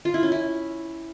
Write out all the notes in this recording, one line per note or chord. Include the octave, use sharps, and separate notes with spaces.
F4
E4
C#4
E4